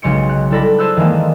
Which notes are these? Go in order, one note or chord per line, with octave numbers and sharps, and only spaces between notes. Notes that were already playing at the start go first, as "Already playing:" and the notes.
B1 C#3 G#3 C6 C#7 D7
F#6
G3 E4 A4 D5 B5 A#6
G#4 C5 A5 E6 F#6
D#3 E3 G#3 A#3